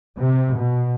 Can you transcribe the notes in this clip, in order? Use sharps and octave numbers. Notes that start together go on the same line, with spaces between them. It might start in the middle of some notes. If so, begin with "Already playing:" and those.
C3
B2